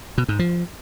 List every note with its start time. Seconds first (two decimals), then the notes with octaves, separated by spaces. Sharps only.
0.18 B2
0.29 G#2
0.39 F3